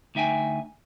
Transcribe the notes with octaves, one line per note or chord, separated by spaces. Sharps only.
D2 D#4 E5 G5 G#5